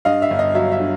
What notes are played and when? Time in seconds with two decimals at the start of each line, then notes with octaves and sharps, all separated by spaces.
0.05 G2 D#5 F5
0.22 E5
0.30 G1
0.39 D#5
0.55 F#3 E5
0.72 E5
0.80 D3